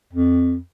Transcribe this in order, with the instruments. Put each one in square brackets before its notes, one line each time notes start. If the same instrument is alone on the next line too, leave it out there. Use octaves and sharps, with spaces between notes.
[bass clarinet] F2